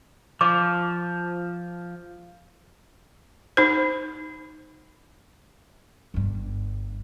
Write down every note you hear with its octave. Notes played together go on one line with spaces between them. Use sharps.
F3 D6
D#4 C5
G1 G2